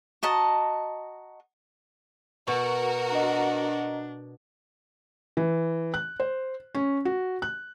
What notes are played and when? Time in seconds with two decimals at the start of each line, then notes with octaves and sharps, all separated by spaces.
0.23 F#4 D#5 A5 A#5
2.48 B2 F#4 A#4 C#6
3.10 D4 D#5 F#5 A#5
5.37 E3
5.94 F#6
6.20 C5
6.75 C#4
7.05 F#4
7.42 F#6